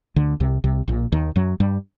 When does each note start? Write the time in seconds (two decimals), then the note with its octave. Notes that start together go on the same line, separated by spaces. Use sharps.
0.16 D2 D3
0.40 C2 C3
0.64 C2 C3
0.88 A#1 A#2
1.12 D#2 D#3
1.36 F#2 F#3
1.60 G2 G3